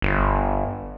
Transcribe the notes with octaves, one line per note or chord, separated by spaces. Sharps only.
G1